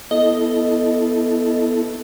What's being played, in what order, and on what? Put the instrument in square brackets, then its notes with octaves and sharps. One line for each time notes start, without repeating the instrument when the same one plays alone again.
[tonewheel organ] B3 E4 A4 [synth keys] D#5